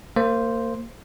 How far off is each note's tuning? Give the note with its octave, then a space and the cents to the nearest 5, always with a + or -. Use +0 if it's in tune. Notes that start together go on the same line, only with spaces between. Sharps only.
A#3 -30 C5 +0